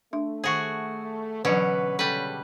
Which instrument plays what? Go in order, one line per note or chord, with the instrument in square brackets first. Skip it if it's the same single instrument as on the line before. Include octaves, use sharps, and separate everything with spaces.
[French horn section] A3 [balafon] D4 E5
[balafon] D#3 C#6 [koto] F#4 G#4
[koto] B2 D3 C#4 [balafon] E3 F#3 [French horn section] B4
[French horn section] C#3 A4 [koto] G3 B4